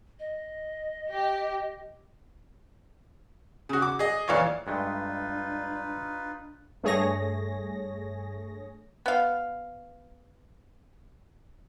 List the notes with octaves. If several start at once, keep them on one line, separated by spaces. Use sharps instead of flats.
D#5
G4
C#3 F#4
D6
G#4 D#5
A#1 E3 F4 C#5 D5
G2 G#3 A3 D4 D#4 F4 B4
G2 A3 G#4 C#5 A#6
B3 F5